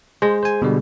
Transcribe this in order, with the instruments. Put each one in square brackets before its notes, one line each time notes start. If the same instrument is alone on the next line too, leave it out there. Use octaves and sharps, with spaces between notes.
[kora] G#3 [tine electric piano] C5
[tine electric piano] C5 G#5
B2 D3 G3